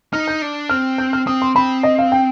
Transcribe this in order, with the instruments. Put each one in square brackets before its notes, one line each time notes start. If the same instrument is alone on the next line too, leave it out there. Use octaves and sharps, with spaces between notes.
[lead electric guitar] D#4 [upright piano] F6
[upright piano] G6
[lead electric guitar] D4
[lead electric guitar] C4 [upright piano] F6
[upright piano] G6
F6
[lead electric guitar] C4 [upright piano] D#6
[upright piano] C6
[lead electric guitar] C4 [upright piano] B5
[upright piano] D#5
F5
G5